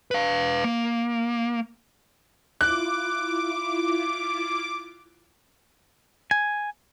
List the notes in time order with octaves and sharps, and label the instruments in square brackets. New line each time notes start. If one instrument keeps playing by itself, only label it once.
[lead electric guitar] B4 F5
A#3
[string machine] E4 F4 [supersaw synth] D6 [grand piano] F#6
[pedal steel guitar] G#5